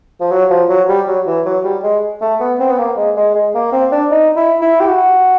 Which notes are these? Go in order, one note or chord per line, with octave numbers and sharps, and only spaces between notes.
F3
F#3
F3
F#3
G3
F#3
E3
F#3
G3
G#3
A3
B3
C4
B3
A#3
G#3
G#3
G#3
A#3
C4
D4
D#4
E4
E4
G4
F#4